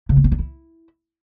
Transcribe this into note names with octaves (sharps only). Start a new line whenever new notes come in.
C#3
A3
C4
D4
E4